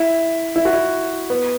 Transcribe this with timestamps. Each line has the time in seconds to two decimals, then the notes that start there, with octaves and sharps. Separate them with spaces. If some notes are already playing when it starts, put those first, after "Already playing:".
Already playing: E4
0.56 E4
0.65 F#4
0.73 E4
1.30 B3